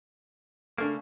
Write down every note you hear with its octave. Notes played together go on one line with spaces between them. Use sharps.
C#3 A3 A#3 D4 A4